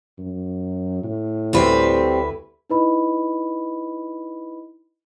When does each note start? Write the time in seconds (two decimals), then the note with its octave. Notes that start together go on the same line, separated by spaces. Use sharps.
0.18 F#2
1.03 A2
1.53 D2 G3 C4 E4 B4
2.70 D#4 E4 B4 D#5 B5